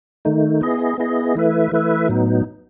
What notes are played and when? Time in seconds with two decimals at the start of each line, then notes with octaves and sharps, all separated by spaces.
0.25 D#3 A3 D#4
0.61 B3 E4 G#4 D#5
0.98 B3 E4 G#4 D#5
1.35 E3 A3 E4 B4 E5
1.72 E3 A3 E4 B4 E5
2.09 A2 F#3 B3 D#4